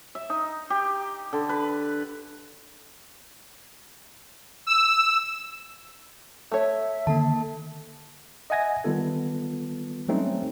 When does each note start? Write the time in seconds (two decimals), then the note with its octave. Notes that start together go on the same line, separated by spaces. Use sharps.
0.15 E5
0.30 D#4
0.70 G4
1.33 D3
1.49 B4
4.67 E6
6.52 A3 C#5 E5
7.07 D3 D#3 A#3 A4 A5
8.50 D#5 E5 F#5 G#5 G#6 A#6
8.84 D#3 G3 B3 F4 A4
10.08 F#3 G3 A3 C4 C#4 D#4